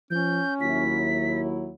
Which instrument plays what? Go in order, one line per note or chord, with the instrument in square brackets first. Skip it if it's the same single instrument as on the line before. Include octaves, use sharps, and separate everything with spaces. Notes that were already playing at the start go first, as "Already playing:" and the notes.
[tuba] F3 [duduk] C#4 [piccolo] G6
[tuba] D#2 [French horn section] F#3 E4 [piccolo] B6